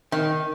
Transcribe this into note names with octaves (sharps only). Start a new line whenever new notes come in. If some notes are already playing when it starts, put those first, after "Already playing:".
D#3